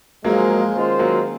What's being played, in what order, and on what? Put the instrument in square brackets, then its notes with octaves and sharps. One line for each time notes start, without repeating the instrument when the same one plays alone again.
[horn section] G#2 F3 G#3 [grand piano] F#3 A#3
[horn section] D#3 G#3 C#4 F4 C5
[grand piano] F#3 A#3